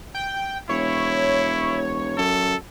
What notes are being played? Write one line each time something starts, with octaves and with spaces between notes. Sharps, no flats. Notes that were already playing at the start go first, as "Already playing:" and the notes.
G5
E1 E4 C#5
F#2 A4